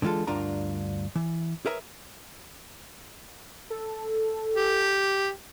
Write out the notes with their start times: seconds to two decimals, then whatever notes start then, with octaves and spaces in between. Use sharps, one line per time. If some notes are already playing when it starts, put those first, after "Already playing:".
0.02 D3 E3 G#3 F4 A4
0.27 D2 G2 D4 F4 A#4 A#5
1.15 E3
1.66 G#4 A#4 B4 C#5 E5 A#5
3.70 A4
4.54 G4